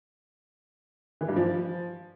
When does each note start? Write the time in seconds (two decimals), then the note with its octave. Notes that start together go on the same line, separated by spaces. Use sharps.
1.21 E3
1.29 G2
1.36 F3